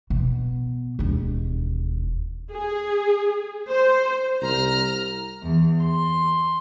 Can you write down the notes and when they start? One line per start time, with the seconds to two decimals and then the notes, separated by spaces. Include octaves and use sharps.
0.10 B2
0.99 E1 D#2
2.52 G#4
3.68 C5
4.42 C2 A#5 F6
5.42 E2
5.82 C6